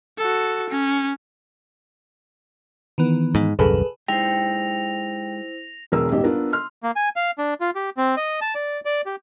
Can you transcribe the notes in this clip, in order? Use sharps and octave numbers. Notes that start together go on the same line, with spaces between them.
F#4 A4
C#4
D#3 E3 B3
G#2
D#1 C2 F#2 G#4 A4 B4
G#3 D#4 E4 G4 C5 G5 A#6 F7
E1 E2 G#4 A#4 E6
D#1 G#1 B2 G4 D#5
B3 D4 F4 A#4
C6 F6
A#3
G#5
F5
D4
F4
G4
C4
D#5
A5
D5
D5
G4